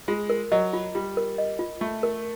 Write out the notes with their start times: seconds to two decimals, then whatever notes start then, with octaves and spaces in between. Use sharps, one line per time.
0.08 G#3 F4
0.30 A#4
0.52 F#3 D#5
0.73 F4
0.95 G3 F4
1.17 A#4
1.38 D#5
1.59 F4
1.81 A3 F4
2.03 A#4